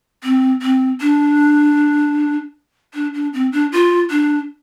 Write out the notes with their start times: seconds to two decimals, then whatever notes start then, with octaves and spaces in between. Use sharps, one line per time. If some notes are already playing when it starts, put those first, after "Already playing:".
0.23 C4
0.62 C4
1.00 D4
2.94 D4
3.14 D4
3.33 C4
3.52 D4
3.72 F4
4.10 D4